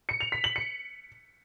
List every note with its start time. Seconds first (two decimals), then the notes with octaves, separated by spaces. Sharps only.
0.09 C#7
0.20 F7
0.32 B6
0.44 F#7
0.56 C#7